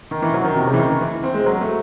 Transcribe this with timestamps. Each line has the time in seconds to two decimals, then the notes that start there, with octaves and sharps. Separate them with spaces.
0.11 D#3
0.22 E3
0.34 F#3
0.44 D#3
0.56 C3
0.67 C#3
0.74 E3
0.79 D#3
0.90 E3
1.01 E3
1.24 C4
1.34 G#3
1.46 F#3
1.61 A3